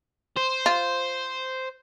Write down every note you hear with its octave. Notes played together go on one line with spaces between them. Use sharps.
C5
F4